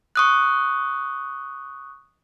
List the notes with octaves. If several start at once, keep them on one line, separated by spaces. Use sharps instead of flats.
C#6 D#6 F#6